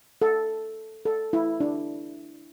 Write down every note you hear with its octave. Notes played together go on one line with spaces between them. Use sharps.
A4
A4
E4
D4